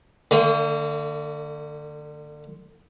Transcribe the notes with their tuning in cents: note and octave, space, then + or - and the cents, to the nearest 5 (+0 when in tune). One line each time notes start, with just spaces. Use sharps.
D3 +25 A#3 -40